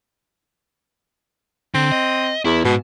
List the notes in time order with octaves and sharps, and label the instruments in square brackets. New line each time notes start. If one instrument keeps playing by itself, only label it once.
[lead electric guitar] D3 [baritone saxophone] C4
[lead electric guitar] D#5
[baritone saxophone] E2 [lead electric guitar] E4
[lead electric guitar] G#2 [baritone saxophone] B2